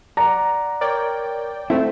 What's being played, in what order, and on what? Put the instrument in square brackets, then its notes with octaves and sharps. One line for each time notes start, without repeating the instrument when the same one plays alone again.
[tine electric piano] D5 F#5 [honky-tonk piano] A#5
[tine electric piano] A#4 C#5 [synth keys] D5 G5
[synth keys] A3 C4 [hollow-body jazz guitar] E4